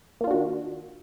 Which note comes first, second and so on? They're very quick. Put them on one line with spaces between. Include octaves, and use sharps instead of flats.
A#3 F4 D4 F#4 D#3